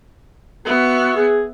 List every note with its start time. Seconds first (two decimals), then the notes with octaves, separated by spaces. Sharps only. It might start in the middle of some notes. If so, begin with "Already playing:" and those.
0.66 B3 F#4 E5
1.16 G#4